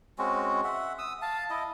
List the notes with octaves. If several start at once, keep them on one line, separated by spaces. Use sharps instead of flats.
G#3 C4 C#4 F#4
E5 F#5
D#6 E6
F5 A5
E4 D#5